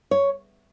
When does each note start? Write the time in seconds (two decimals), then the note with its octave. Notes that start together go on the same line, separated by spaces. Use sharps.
0.11 C#5